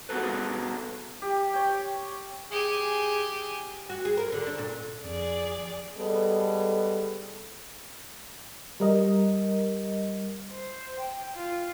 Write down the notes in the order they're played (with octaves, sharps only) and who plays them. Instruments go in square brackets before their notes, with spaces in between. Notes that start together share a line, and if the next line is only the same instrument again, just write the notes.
[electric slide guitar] B3 F#4 G#4 A4 B4
[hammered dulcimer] G4
C#5 G5
[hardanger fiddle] G4 G#5 [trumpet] G#4
[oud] F#4
G#4
A#4
D3
D4
A#2
[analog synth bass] F2 [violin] G#4 D5
[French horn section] G3 G#3 B3 A4
[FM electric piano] G3 A#4 D#5
[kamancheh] C5
G5
F4